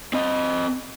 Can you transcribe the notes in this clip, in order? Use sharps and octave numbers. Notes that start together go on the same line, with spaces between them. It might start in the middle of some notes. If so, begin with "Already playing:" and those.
C4 D#5